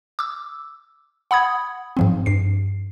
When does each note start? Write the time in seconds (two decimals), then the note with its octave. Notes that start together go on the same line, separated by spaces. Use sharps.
0.19 D6 E6
1.31 F#5 B5 D#6 G#6
1.97 G#2 F3 C4
2.26 G2 C7